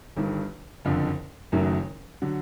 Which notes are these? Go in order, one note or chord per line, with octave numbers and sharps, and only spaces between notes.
G1 G2 D#3
F#1 F2 D3
F#1 F#2 D#3 F#3 A3
D3 F#3